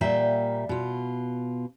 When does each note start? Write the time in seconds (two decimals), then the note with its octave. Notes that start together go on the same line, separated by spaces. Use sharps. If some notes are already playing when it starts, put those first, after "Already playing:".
0.01 A#2 G3 A#3 E5 G5
0.69 B2 F4